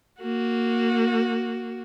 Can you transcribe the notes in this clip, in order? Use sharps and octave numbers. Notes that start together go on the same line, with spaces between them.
A#3 F#4